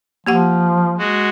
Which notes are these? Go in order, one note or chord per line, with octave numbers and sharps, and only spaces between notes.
F3 A#3 G4 F#5
G#3 F#4